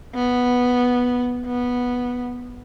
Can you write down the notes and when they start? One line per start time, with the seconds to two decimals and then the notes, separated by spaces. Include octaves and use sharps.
0.15 B3
1.47 B3